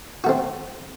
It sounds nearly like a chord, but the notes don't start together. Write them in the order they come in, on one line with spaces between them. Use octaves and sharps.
F#4 A3 C4